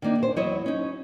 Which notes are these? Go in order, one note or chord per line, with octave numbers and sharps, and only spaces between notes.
D#3 G3 A#3 D4 D#4
G#4 C5
E2 F#3 E4 C#5 D#5
C#4 D#4